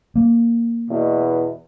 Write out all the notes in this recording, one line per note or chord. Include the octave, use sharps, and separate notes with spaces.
A#3
E2 B2